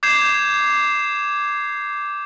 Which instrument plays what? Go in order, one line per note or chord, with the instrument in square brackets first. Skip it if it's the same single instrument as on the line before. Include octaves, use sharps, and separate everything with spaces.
[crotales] D6 G6 G#6 C7 E7